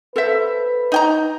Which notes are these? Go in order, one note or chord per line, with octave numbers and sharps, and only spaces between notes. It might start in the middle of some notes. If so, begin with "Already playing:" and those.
A4 B4 C5 E5
D#4 G5 A#5